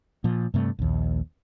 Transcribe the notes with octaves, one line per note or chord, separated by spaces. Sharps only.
A#2 F3
G2 C3 A3
A#1 D#2